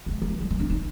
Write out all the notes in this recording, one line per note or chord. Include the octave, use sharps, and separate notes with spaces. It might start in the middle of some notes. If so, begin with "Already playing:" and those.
B3
G#3
F3
G3
G3
G#3
D4
D#4